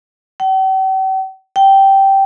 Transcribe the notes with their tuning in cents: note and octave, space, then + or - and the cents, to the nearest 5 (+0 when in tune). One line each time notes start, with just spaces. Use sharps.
G5 -45
G5 -10